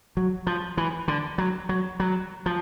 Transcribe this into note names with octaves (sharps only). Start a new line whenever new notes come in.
F#3
F3
E3
D3
F#3
F#3
F#3
F3